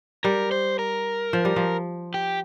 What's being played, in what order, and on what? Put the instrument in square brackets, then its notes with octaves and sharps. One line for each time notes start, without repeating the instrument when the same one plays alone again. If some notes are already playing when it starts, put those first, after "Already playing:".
[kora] G3 [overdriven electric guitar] A#4
[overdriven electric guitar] C5
A#4
[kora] F3
G3
F3
[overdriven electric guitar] G4